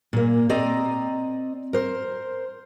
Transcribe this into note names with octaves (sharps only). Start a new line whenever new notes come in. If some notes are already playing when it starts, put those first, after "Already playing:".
A#2 A#3
C4 D5 D#5 A#5
A#4 C5